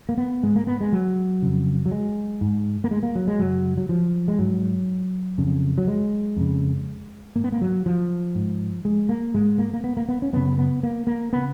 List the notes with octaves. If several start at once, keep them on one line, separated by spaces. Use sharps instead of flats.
A#3
B3
G#2 G#3
A#3
B3
G#3
F#3
F2 C#3
F#3
G#3
G#2
A#3
G#3
A#3
F#3
G#3
F#2 C#3 F#3
F#3
F3
G#3
G#2 F#3
F2 C#3
F#3
G#3
F2 C#3
G#2 A#3
B3
A#3
F#3
F3
G#2
G#3
A#3
G#2 G#3
A#3
A#3
B3
A#3
B3
C#4
F#2 C#3 B3
B3
A#3
A#3
C#3 B3